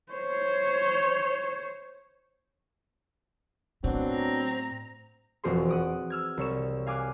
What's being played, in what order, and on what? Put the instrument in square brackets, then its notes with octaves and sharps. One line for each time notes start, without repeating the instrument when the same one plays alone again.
[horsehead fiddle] C5 C#5
[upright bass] A2 [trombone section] F#3 B3 D4 [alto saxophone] C4
[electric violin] A#5
[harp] E1 F2 C4 F#4 G#4 C6
F#5 D#6 D7
E6 F6 G#6
C2 C#5 E7
F5 G#5 D6 F6 F#6